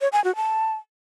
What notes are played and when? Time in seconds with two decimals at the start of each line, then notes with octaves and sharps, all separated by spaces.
0.01 C#5
0.12 G#5
0.24 F#4
0.36 A5